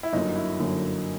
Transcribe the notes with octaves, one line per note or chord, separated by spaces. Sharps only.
E4
G1 F#2 D3 F#3 A#3 D#4
E4
G1 F#2 D3 F#3 A#3